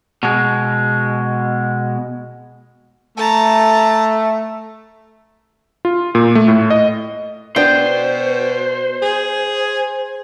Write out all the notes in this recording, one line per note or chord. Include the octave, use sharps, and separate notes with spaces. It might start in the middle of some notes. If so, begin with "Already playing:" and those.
B2 G#3
A3 A5 A#5
F4
A#2
A3
A2
D#5
B2 B3 D4 C5 G5
G#4